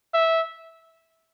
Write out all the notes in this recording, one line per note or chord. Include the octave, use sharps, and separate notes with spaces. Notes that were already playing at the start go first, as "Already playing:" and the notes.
E5